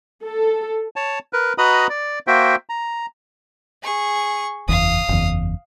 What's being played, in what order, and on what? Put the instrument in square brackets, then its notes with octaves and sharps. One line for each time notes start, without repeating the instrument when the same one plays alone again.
[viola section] A4
[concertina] C#5 A5
A#4 B4
F#4 B4 D#5 A#5 B5 D#6
D5
A#3 F#4 C5 E5 G5
A#5
[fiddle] G#4 C#6
[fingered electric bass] F#1 E2 [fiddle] F5 D#6
[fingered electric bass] F#1 E2